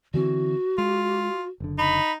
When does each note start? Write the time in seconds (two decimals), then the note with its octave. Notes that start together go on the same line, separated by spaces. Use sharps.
0.14 D3 E3 C4 F#4
0.78 G#3 F4
1.60 F#1 D3
1.78 D#4 B5